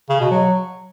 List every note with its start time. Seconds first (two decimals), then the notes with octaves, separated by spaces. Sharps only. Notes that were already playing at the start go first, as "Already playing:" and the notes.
0.10 C#3
0.20 B2
0.31 F#3